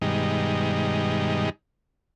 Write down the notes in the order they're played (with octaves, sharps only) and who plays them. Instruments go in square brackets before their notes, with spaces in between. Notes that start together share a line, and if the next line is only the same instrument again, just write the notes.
[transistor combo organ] G2 B2 D#3 G3 G#3 D#4